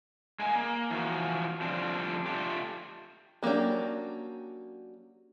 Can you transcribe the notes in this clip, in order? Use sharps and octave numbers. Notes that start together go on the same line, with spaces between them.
G#3 A#3 G#5
A#3
E3 F3 F#4
D3 F3 G3 C4 D4
A3 D4 F4 G4
F#3 A#3 C#4 D4 G4